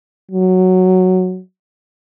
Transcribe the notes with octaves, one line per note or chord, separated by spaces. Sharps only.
F#3